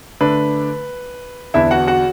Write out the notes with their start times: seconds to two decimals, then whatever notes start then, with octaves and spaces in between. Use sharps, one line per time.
0.21 D3 A3 D4 B4
1.54 E2 D3 B3 D4 E4 E5
1.71 F#4 F#5
1.87 F#4 F#5